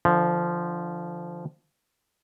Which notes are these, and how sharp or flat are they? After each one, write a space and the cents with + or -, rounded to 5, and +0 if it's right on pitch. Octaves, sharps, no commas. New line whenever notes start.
D3 +20 F3 -10